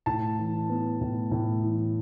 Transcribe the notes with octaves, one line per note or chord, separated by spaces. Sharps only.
A2 A5
E3
B3
A2
A2
E3